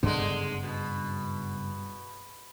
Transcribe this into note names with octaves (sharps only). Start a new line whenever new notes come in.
F#1 G2 D3 G#3 B3
B2